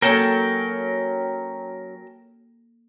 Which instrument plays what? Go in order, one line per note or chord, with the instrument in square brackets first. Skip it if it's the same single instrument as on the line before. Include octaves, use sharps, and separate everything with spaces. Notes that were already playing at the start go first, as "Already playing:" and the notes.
[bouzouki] F#3 C#4 [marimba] A#3 A4 [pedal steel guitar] A#4 G5 A5